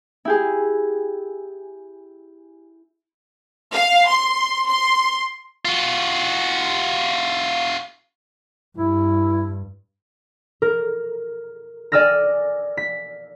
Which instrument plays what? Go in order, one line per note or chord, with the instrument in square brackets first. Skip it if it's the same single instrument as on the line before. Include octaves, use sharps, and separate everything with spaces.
[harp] E4 G4 G#4
[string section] F5
C6
C6
[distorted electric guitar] F4 F#4
[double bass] G2 [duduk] E4
[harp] A#4
D5 G#5 E6 F6 A#6
B6